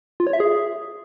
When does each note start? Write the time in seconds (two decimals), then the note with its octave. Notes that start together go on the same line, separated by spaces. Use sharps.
0.20 F4
0.27 C#5
0.33 E5
0.40 G#4